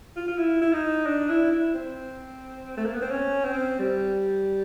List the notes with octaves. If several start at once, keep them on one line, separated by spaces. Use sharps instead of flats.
F4
F4
E4
E4
D#4
D4
E4
E4
C4
A3
A#3
B3
C4
C#4
C4
G3